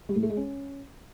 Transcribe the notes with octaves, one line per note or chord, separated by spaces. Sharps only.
G3
A2
A3
G#3
C#4